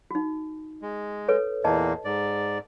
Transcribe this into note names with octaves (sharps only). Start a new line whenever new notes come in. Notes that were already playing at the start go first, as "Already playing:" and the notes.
D#4 F#4
G#3
A4 B4 C#5
E2 A#2 A#3 D#5 A5
G#2 D5